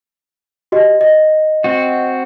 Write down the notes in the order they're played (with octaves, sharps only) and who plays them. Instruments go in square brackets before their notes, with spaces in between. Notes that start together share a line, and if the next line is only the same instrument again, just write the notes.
[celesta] F#4 G4 D#5
D#5
[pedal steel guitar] C4 F#4